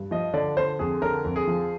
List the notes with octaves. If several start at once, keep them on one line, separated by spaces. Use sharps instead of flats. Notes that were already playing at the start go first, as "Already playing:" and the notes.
Already playing: G2
F3 D#5
D3 D5
D3 C5
F2 G#4
D3 A#4
F2
G#4
F3